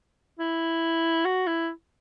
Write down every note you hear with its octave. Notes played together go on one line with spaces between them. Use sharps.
E4
F#4
E4